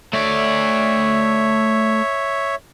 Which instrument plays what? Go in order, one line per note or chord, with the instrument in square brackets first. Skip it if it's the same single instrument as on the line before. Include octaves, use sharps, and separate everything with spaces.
[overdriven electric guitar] A3 D5 [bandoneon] C#5 E5